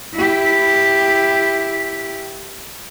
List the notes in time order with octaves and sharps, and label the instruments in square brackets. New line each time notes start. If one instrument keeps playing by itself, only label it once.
[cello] E4 G4